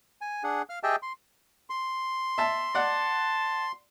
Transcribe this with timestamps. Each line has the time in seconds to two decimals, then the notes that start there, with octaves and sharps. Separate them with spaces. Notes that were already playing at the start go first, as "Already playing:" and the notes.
0.21 G#5
0.44 D4 G#4 F#5
0.70 F5 F6
0.83 G4 G#4 D#5 E5 G5 A5
1.02 C6
1.70 C6
2.38 E5 A5
2.75 D5 F#5 A5